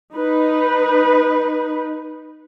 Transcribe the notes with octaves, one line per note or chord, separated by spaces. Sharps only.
D#4 B4